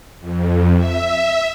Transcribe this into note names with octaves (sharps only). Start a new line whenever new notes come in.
F2
E5